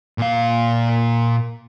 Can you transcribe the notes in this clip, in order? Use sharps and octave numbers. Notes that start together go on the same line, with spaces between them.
A#2 F5